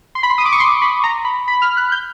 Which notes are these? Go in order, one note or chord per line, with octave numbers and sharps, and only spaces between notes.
C6
B5
C6
D#6
D6
C#6
C6
B5
A#5
B5
B5
F6
F#6
G6